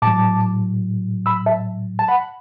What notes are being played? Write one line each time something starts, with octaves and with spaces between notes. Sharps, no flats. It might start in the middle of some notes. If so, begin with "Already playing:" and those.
A2 F#3 A5 D6
B5 E6
E5 A5
A5
F#5 B5